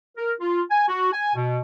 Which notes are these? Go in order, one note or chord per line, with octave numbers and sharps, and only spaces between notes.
A#4
F4
G#5
F#4
G#5
B2